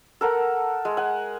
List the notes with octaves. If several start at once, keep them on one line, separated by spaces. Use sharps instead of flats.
A4 A#4 F#5
G#3
F#5 G#5